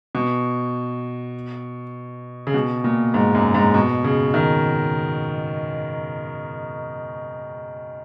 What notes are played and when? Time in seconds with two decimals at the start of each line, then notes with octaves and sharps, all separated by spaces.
0.15 B2
2.47 C#3
2.54 B2
2.84 A#2
3.14 G#2
3.35 F#2
3.54 G#2
3.74 B2
4.04 C#3
4.34 D#3